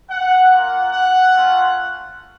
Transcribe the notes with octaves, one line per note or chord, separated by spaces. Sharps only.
F#5
A#3 F4 F#5
F#5
A3 C#4 F4